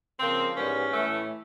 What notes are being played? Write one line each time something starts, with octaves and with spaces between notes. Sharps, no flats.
C#3 F3 A#3 C4
G#2 E3 G3 B3 C#4
A2 E3 A3